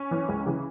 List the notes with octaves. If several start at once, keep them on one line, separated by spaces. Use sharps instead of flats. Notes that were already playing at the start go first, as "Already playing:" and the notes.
Already playing: C#4
E3
C#2
C#3 E3